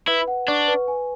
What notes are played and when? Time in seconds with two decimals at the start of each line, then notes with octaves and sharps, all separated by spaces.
0.07 E4 B4
0.28 F#5
0.48 D4 C#6
0.68 B4
0.88 G#5